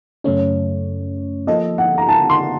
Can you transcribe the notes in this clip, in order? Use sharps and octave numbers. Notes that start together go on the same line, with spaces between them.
F#2 C#3 A3 C#4 C#5
F3 A#3 F4 A4 D#5
F#5
A#5
A5
C6